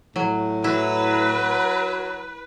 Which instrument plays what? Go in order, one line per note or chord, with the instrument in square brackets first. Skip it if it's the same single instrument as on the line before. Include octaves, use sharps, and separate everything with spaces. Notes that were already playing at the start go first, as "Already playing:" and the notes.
[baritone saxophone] A2 [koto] F#3
[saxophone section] F#3 [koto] E4 [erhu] B4